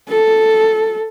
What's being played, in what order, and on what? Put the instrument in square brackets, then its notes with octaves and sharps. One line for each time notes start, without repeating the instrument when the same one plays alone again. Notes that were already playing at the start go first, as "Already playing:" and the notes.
[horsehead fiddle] A4